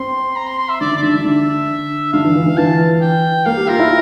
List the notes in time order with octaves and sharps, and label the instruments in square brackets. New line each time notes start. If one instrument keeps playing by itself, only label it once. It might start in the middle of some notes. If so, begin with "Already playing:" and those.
Already playing: [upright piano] C4 [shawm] C6
[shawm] A#5
C6
C6
E5
[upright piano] D3 [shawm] D5
[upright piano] D3
[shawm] D5
[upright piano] D3 [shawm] E5
[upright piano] D3
D3
[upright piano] D3 [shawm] F5
[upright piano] E3
E3
D3
[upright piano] E3 [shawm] A5
[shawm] G5
[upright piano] A#3 [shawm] F5
[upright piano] G4
[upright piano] F4 [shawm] A#4
[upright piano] E4